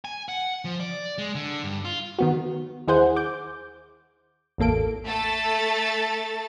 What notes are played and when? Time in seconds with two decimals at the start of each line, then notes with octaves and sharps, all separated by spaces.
0.05 G#5
0.29 F#5
0.65 F3
0.80 D5
1.18 G#3
1.35 D3
1.64 G2
1.85 F4
2.19 D#3 B3 F#4
2.88 D#2 E4 G#4 C5 F#5 G6
3.16 D6 G6
4.58 A1 E2 A#3 A4 D7
5.05 A3 A4 A6